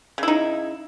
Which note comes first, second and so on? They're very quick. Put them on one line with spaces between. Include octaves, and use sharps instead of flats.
C#3 E4 D#4